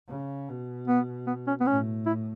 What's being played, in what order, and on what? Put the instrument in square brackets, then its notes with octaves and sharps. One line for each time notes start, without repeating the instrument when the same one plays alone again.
[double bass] C#3
B2
[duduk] B3
B3
C#4
B3
[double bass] A2 [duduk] C#4
[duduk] E4